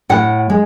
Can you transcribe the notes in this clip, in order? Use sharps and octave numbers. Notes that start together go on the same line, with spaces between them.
A2 F#5
G#3